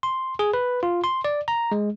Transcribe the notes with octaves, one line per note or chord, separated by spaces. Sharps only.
C6
G#4
B4
F4
C6
D5
A#5
G#3